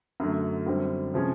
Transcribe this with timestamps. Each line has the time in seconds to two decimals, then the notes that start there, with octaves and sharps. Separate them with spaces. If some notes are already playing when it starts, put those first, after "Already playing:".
0.20 F#2 D3 F#3 A3
0.66 F#2 D3 G3 C4
1.14 C3 F3 G#3 C#4